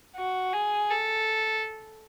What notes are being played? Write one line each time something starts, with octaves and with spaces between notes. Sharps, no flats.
F#4
G#4
A4